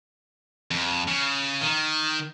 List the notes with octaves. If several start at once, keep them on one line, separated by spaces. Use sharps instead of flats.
F2
C#3
D#3